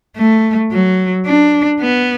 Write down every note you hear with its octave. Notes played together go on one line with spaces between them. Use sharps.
A3
F#3
D4
B3